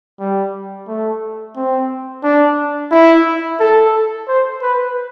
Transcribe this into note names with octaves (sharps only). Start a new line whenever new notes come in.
G3
A3
C4
D4
E4
A4
C5
B4